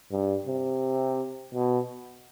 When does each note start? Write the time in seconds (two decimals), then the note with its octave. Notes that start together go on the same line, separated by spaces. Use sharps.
0.11 G2
0.47 C3
1.54 B2